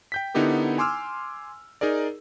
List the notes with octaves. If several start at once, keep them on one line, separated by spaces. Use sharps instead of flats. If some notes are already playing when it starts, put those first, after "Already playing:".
G5 G6 B6
D3 B3 D#4 E4 G4 A#4
G#5 C6 D6 E6 F6
D#4 G#4 A#4 D5